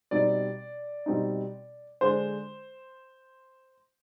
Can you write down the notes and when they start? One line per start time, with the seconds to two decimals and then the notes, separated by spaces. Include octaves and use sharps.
0.11 B2 G3 C4 D#4 D5
1.06 B2 G3 C4 D#4
2.01 D3 G#3 D4 C5